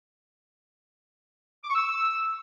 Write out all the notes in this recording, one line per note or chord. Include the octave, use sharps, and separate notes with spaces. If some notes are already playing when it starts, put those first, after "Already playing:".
D6
C#6
E6